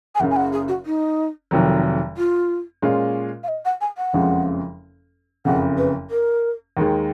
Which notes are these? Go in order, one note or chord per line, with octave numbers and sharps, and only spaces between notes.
G#5
F#1 F#2 C#3 F#5
G#5
F#5
G#4
F#4
D#4
F1 F2 D#3 F#3
F4
A#2 G#3 C#4 F4
F5
D#5
F#5
G#5
F#5
F#1 F2 C#3 F3 G#3
F#1 F2 C#3 F#5
B4
A#4
D#2 D#3 G#3